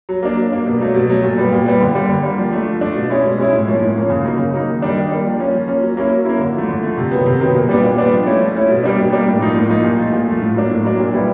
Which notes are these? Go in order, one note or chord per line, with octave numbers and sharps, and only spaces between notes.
F#3
A#3 D4
F#3
A#3 D4
B2
F#3 A3
B2
F#3 A3
A#2
G3 B3
A#2
G3 B3
D3
G3 A#3
D3
G3 A#3
F3
A3 D4
F3
A3 D4
B2
G#3 C#4 E4
B2
G#3 C#4 E4
A2
F3 A#3 C#4
A2
F3 A#3 C#4
C#3
F#3 A#3 D#4
C#3
F#3 A#3 D#4
D#3
G3 A#3 D4
D#3
G3 A#3 D4
F3
A#3 C#4
F3
A#3 C#4
F#3
A#3 C#4 E4
F#3
A#3 C#4 E4
D3
F3 A3
D3
F3 A3
C3
D#3 F#3 B3
C3
D#3 F#3 B3
A#2
G3 B3 D4
A#2
G3 B3 D4
F3
A3 C#4 E4
F3
A3 C#4 E4
B2
G3 A#3 D4
B2
G3 A#3 D4
A2
F3 A#3 D#4
A2
F3 A#3 D#4
A#2
F3 A3
A#2
F3 A3
A2
F#3 A#3 D4
A2
F#3 A#3 D4
A#2
G3 B3 E4